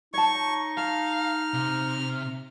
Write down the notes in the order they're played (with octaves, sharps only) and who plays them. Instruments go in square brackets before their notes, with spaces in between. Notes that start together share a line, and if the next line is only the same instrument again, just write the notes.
[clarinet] D#4 [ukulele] C#5 A5 [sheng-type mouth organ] C#6
[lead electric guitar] F5 [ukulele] A5 [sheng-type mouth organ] F6
[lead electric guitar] C3